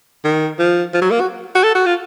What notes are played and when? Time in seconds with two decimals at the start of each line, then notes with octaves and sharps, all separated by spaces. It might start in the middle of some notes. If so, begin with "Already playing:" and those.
0.24 D#3
0.59 F3
0.94 F3
1.02 F#3
1.11 A#3
1.20 F#4
1.55 F#4
1.63 A4
1.75 F#4
1.86 F4